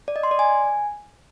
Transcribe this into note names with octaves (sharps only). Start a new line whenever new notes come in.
D5
D#5
C6
D5
G#5